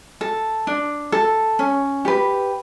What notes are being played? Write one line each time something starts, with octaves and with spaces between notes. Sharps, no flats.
A4
D4
A4
C#4
G4 B4